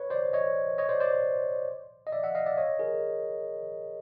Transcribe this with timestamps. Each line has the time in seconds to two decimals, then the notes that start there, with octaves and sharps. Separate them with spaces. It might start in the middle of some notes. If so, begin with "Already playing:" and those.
Already playing: B4 C#5
0.10 C5 D5
0.33 C#5 D#5
0.78 C#5 D#5
0.89 C5 D5
1.00 C5 D5
2.07 D#5
2.12 D5 E5
2.23 E5 F#5
2.35 D#5 F5
2.46 D5 E5
2.58 C#5 D#5
2.79 G#4 A#4